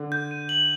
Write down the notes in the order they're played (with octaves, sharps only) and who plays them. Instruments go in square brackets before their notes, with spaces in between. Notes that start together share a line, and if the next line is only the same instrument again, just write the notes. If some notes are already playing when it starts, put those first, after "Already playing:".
Already playing: [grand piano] D3
[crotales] G6
D#7
F#7